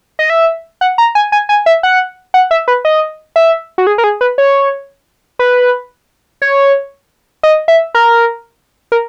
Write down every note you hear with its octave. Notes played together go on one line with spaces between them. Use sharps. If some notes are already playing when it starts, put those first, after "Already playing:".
D#5
E5
F#5
A#5
G#5
G#5
G#5
E5
F#5
F#5
E5
B4
D#5
E5
F#4
G#4
A#4
G#4
B4
C#5
B4
C#5
D#5
E5
A#4
A#4